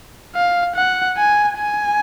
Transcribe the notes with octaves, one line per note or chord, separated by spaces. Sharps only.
F5
F#5
G#5
G#5